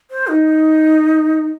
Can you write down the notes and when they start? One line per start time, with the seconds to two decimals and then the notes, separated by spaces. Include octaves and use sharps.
0.11 C5
0.28 D#4